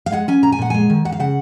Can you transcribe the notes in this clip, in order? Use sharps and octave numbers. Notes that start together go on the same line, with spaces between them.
F5
G#3 F#5
C#4 G#5
A#2 A#5
G#5
A#2 F#5
G#3 G#5
D#3
D#2 F#5
F5
C#3 F#5